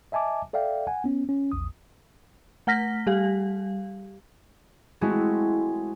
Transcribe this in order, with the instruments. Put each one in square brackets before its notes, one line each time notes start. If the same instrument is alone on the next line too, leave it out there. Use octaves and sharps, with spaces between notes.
[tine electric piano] D#5 E5 G#5 A5 D6
A4 D5 E5 F5 G5
F#5 G#5
B3 C#4
C#4
A#1 E2 D#6
[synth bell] A3 F#5 F6 A#6 B6
G3 G4 F5
[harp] G#3 A3 C4 E4 F#4 G#4